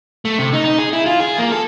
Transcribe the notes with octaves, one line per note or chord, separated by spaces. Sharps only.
A3
C3
D#4
D#4
G#4
E4
F4
G#4
A#3
A4